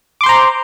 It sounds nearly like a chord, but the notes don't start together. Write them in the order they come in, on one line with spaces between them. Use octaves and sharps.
D6 C6 C5 A#5